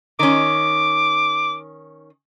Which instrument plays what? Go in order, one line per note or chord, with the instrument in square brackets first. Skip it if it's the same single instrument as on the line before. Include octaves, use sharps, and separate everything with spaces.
[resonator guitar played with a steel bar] D#3 C#4 [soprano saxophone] D6